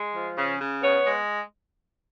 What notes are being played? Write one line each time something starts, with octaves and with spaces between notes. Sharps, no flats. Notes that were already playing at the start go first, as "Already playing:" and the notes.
Already playing: G#3
F3
C#3
C#3
B3 C#5
G#3